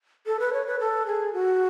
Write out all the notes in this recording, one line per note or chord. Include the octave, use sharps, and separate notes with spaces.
A4
B4
C#5
B4
A4
G#4
F#4